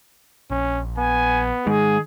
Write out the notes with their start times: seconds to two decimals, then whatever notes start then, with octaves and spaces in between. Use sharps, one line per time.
0.51 A#1 C#4
0.98 B3 G#5
1.67 G#2 D#3 G#4